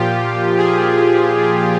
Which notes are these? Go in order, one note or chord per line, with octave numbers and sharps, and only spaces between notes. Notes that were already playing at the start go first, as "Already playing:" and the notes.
Already playing: A#2 F3 F4 G4
G#4